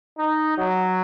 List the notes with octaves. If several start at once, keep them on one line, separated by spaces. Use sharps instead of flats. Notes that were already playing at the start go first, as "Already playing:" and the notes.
D#4
F#3